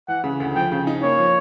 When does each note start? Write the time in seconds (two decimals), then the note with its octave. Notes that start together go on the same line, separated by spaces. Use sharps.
0.08 E3 F#5
0.24 C#3
0.40 D2
0.55 F3 G5
0.72 C#3
0.87 D#4
1.03 A#3 C#5
1.19 F3